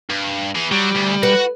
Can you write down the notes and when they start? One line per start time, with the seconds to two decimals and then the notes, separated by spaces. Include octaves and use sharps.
0.10 G2
0.56 E3 G#4
0.72 F#3 G3
0.95 D2
1.23 F#4 B4 F#5